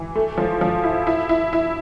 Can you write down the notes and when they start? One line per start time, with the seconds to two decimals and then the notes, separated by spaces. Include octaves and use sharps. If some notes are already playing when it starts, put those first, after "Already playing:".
Already playing: E3
0.15 A3
0.38 F3
0.61 F3
0.84 E4
1.07 E4
1.29 E4
1.53 E4